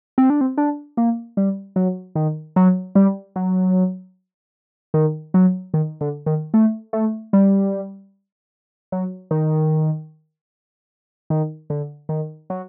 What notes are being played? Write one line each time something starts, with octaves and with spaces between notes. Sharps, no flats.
C4
D4
C4
D4
A#3
G3
F#3
D#3
F#3
G3
F#3
D#3
F#3
D#3
D3
D#3
A3
A3
G3
F#3
D#3
D#3
D3
D#3
F#3